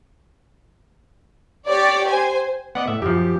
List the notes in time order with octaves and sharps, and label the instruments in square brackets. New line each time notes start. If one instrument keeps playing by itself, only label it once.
[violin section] G4 C#5 D5
C5 G#5
[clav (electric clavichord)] B3 D5 D#5 [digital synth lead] F#5
[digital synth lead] A2 [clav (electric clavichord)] E5
[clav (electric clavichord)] F#2 F3 [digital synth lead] G4